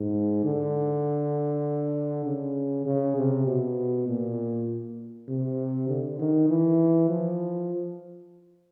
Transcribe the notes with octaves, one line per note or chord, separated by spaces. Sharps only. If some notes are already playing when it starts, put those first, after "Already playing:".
Already playing: G#2
D3
C#3
C#3
C3
B2
A#2
C3
D3
D#3
E3
F3